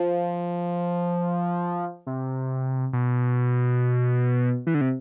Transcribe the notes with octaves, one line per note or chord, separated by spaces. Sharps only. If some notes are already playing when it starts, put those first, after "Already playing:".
Already playing: F3
C3
B2
E3
D3
C3